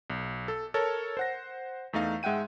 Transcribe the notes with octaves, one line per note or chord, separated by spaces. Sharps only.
B1
A4
A4 A#4 C#5 A5
C5 F#5 A#6
E2 A3 D#4 F5
G#2 G#3 E5 F#5 G5 D#7